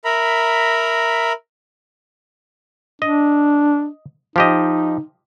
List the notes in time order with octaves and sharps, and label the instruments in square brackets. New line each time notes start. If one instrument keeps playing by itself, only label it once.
[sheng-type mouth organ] A#4 E5 A#5 B5
[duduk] D4 [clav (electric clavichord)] D#5
[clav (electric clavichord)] F3 G4 D#5 [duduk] D#4